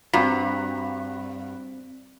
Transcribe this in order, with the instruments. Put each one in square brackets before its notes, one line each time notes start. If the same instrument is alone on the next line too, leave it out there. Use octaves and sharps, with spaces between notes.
[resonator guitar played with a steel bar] G2 [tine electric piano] C4 B6 [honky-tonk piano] F#4 B4 A#5